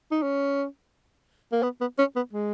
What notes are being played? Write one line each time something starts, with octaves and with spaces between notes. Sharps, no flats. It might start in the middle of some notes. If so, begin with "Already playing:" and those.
D#4
C#4
A#3
B3
B3
C#4
B3
G#3